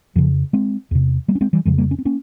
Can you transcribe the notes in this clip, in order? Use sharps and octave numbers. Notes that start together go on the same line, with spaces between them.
F2 C#3 F3
G#3 C4
E2 C3
G3 A#3
C#4
G#3 C4
E3 G3
F2 C#3 F3 G#3
G3 A#3
C#4
C4
A#3 C#4